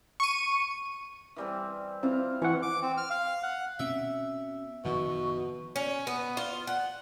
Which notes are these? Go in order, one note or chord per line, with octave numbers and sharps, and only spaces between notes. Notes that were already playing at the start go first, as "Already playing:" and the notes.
C#6 D#7
E3 G3 C4
C4 E4 F4 F5
E3 F#5 C#6
D6
C4
F6
F5
F#5
B2 C4 C#4 E5
F#1 B2 D#3 F3 C#6
C#4
B3
F4
F#5